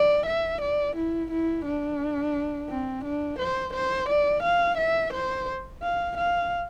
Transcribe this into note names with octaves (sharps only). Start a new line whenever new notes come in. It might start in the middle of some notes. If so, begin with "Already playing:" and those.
Already playing: D5
E5
D5
E4
E4
D4
C4
D4
C5
C5
D5
F5
E5
C5
F5
F5